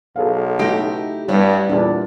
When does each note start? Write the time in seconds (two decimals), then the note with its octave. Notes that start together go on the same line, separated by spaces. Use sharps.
0.16 B1 G#4 A4 F5
0.59 C#3 A3 D#4 E4 F#4 G4 A#6 D7
1.29 G2 G3 B3 E4 C#5
1.69 E2 A#2 G3 D4